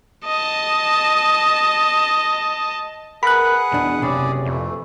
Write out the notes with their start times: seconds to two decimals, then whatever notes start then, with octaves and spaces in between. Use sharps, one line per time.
0.25 D#5 A5
3.23 G#4 A#4 B4 F#5 B5 F#6
3.72 E2 B2 D4
4.02 F#1 C3 C#4 G#4 D5
4.46 F2 E3 A3